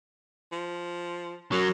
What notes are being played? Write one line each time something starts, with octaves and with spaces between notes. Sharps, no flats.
F3
F#2 F#3